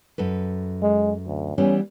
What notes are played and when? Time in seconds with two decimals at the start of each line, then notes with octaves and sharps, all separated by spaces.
0.18 F#2 A4 B4
0.82 G#3
1.27 D2
1.58 E3 G3 B3 C#4